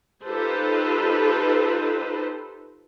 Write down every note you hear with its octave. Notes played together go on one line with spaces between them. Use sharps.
D#4 F4 G4 A4 B4 C5